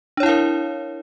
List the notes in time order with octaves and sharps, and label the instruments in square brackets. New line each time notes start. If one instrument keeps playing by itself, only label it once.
[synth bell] D4
C#5
E4
F5
A#4